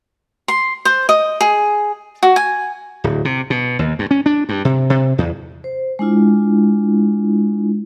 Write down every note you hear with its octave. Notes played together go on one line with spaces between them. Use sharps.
C6
C5
D#5
G#4
F#4
G#5
D1
C3
B2
D#2
G2
C#4
D4
G2
C3
C3
E2
C5
G#3 D4 E4 F4